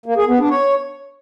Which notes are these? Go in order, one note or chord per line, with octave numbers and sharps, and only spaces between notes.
A#3
G#4
B3
D4
C#5